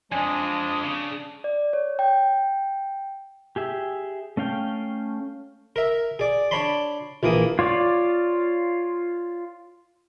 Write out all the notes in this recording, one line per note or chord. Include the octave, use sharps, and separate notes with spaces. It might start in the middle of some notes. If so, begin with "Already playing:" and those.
F2 G#3 D4 G#5 D#6
C#3
D5
C#5
G5
G4 G#4 E5
A3 C#4 F5 G5
A#4 E5
G#4 D5
D4 C#5 A5 B5 C6
A#1 E3 A#3 D#6
F4 C#5 D5